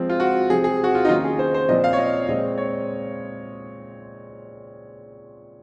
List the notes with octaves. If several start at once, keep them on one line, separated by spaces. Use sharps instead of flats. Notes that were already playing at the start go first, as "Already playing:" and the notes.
Already playing: F3 G#3 C4
F4
F#4
C3 F3 C4 G#4
G#4
F#4
F4
D#4
D#3 A#3 C#4 F4
G#4
C5
C5
A#2 F3 C4 D#5
F5
C#5
D#5
A#2 G#3 C4 D#5
C#5